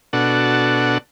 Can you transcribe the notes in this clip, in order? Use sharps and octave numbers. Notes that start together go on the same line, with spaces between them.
B2 D4 F#4 A4